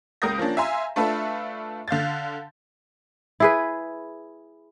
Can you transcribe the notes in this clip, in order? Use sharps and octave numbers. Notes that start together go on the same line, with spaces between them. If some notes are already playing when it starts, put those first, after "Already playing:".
C#2 A#4 D#6 G6 A#6
F3 A#3 C#4 D4
E5 F5 G#5 A#5 C6
A3 D4 F4 A4 B4 E5
D3 F5 G6 A6
E4 G#4 B4